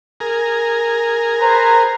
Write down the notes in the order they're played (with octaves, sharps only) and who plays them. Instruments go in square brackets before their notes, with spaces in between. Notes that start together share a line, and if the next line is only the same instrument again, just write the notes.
[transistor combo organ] G#4 A#4
[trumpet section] B4 C5 A#5